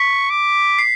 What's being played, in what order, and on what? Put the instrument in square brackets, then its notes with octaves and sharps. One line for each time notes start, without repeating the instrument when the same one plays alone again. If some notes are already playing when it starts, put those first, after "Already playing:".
Already playing: [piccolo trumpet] C#6 [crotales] B6
[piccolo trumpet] D6
[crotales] C7